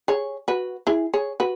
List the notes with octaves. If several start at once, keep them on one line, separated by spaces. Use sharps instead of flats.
G#4 C#5
F#4 B4
E4 G#4
G#4 C#5
F#4 B4